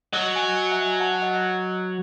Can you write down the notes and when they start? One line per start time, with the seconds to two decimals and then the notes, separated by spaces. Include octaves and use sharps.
0.13 F#3 D#5 F#5
0.36 G#5
0.42 D#5 F#5
0.72 E5 G#5
1.00 F#5 A5
1.22 D#5 F#5